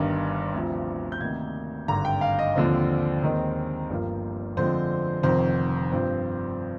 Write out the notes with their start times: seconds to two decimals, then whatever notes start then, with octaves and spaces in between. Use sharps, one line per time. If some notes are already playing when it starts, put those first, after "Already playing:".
Already playing: G1 G2 D#3
0.53 D2 C3 F3 C4
1.12 G6
1.20 D2 C3 D#3 A#3 G#6
1.88 G#1 G2 D3 A#5
2.05 G5
2.21 F5
2.39 D#5
2.56 D#2 D3 F3 C4
3.22 D#2 D#3 G#3 C4
3.89 G1 G2 F3 A#3
4.57 F2 D3 F3 G#3 C4 C5
5.23 F1 F2 D#3 C5
5.91 G2 F3 C4